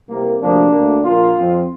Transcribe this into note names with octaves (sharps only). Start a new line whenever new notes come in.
C2 C3 A#3
D2 C3 F3 A#3 D4
D2 D3 A#3
A#1 A#2 A#3 F4
F2 F3 C4